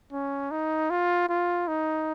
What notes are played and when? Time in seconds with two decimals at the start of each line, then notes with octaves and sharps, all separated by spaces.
0.12 C#4
0.51 D#4
0.90 F4
1.29 F4
1.68 D#4